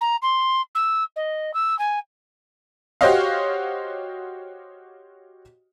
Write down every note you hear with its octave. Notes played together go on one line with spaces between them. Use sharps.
A#5
C6
E6
D#5
E6
G#5
F#4 G4 C5 C#5 D#5 F5